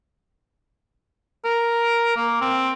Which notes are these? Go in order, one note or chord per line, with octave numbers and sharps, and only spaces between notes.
A#4
A#3
C4